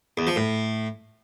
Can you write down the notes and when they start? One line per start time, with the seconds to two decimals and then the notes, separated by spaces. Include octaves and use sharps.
0.18 E2
0.27 F3
0.36 A2